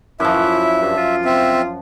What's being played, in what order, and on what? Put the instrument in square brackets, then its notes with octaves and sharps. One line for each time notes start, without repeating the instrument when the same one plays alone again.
[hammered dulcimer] F#2 F3 [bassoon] E4 [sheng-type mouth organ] E5
[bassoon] G2
F4
[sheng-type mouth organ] C4 E5